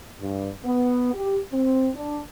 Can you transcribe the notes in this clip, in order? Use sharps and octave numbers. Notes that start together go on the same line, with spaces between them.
G2
B3
G4
C4
D4